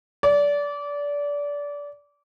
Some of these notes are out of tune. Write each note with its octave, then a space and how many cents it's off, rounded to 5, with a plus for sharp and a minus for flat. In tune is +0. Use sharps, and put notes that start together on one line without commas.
D5 -25